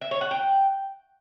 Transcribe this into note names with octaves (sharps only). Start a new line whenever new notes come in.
E5
C#5
F#5
G5